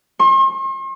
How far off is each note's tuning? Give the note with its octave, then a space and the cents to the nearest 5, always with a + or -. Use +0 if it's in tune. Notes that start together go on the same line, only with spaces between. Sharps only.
C6 +45